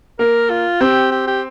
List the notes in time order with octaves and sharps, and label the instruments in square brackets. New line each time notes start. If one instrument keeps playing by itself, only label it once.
[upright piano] A#3 [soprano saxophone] A#4
[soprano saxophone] F4
[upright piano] C4 [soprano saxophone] G4
[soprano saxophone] G4
G4